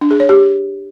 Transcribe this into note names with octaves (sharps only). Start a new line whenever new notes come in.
D4
G#4
C#5
G4